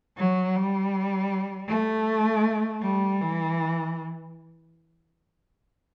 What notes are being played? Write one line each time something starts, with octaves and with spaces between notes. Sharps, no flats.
F#3
G3
A3
G3
E3